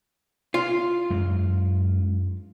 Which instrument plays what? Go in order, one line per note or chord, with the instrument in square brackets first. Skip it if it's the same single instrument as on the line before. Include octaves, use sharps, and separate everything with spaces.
[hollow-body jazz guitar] F4
[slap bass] F#2 G#3